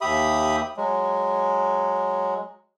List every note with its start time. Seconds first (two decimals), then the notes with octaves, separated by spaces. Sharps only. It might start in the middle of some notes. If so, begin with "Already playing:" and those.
0.01 D#2 G4 E5 B5 D#6
0.77 F#3 G#3